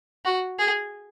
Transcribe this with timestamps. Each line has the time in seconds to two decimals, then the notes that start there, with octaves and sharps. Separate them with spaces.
0.25 F#4
0.59 G#4